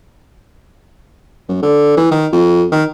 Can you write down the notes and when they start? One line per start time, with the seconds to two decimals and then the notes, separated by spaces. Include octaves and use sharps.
1.49 F#2
1.63 D3
1.97 E3
2.11 D#3
2.32 F2
2.72 D#3